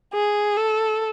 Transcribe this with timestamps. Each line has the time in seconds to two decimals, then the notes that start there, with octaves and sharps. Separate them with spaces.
0.14 G#4
0.57 A4